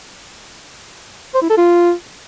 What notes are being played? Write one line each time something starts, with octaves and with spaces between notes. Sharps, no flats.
C5
E4
A4
F4